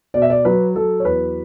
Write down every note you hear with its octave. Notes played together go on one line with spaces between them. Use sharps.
B2 D5
E5
D5
F#3 B4
F#3 A4
C#5
E2 B4